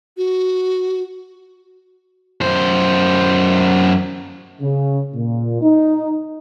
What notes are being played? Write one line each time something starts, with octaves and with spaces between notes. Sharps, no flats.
F#4
F#2 C5
C#3
A#2
D#4